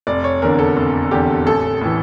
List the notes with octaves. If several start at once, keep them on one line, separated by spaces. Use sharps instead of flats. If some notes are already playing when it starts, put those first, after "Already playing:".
F1 D5
C#5
E2 D3 A#4
A4
F1
E2 D3 G4
A1 A4
A2 E3